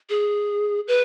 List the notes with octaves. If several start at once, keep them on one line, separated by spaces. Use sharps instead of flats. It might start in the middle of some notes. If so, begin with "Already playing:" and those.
G#4
B4